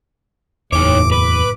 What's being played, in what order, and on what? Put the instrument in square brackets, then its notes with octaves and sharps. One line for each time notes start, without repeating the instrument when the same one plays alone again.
[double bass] F#1 A2 [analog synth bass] E2 [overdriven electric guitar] D#4 C#5 [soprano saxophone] D6
[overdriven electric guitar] B4 [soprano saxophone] D6